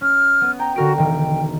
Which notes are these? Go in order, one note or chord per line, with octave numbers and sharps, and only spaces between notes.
C#4 F6
B3
G5 A#5
D3 F#4 A#4 D7
E1 D#3 G5